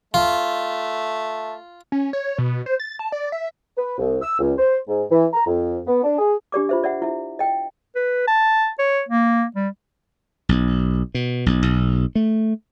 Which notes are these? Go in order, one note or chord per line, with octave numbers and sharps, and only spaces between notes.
A3 F4
C#4
C#5
B2
C5
A6
A5
D5
E5
B4
C2
E6
C#2
C5
G#2
E3
A#5
F2
B3
D4
G#4
D4 G4 D5 D6
F4 C5 E5
D5 E5 F#5
E4 E5
D#5 G5
B4
A5
C#5
A#3
G3
B1
B2
B1
B1
A3